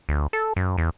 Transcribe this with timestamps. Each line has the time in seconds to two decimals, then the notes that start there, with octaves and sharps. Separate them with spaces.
0.09 D2
0.33 A4
0.56 F#2
0.78 E2